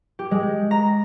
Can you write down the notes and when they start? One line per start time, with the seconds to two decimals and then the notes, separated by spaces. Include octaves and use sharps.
0.19 G4
0.31 G#3
0.71 A#5